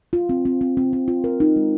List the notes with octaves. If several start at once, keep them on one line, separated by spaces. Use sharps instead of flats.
F4
C4
C4
C4
C4
C4
F4
A#4
D#4
G#3